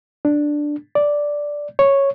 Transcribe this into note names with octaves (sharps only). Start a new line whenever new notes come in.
D4
D5
C#5